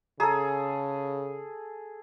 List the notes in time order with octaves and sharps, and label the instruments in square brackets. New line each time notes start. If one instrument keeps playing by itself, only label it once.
[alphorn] C#3 [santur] G#4 A4 [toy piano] A#5